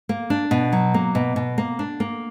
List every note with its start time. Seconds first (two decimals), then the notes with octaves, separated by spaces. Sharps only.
0.09 A#3
0.30 D4
0.51 B2
0.72 F#3
0.94 A#3
1.15 B2
1.36 B2
1.58 A#3
1.79 D4
2.00 A#3